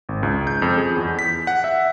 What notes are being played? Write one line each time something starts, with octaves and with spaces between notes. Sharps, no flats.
G#1
C#2
G6
F2
G#4
E2
B6
F#5
E5